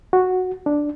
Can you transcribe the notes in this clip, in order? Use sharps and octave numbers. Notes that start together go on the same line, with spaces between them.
F#4
D4